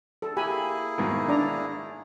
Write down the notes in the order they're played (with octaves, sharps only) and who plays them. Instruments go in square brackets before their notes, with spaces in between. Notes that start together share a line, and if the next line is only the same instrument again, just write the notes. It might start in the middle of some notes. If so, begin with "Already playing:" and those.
[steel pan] A4
[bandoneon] A#3 E4 G#4 [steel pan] G4 G#5 B5
[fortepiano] G#2 B2 D#3
[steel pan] D4 D5 A#5